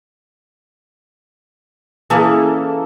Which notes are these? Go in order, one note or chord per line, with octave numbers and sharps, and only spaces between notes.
E3 A#3 C#4 G#4 A4